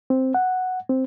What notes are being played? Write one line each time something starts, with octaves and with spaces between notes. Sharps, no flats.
C4
F#5
C4